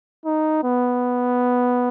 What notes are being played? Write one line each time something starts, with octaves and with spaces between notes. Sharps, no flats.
D#4
B3